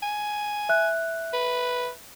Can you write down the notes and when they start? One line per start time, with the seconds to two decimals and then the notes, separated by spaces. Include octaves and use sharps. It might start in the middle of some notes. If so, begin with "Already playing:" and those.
0.03 G#5
0.69 E5 F#6
1.33 B4